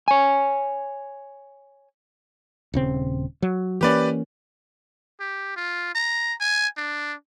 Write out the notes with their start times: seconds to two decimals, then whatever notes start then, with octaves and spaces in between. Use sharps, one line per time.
0.08 C#5 G#5
2.74 D#1 C#3 C4
3.42 F#3
3.81 E3 A#3 C#4 G4 B4 D5
5.20 G4
5.56 F4
5.95 A#5
6.40 G#5
6.77 D4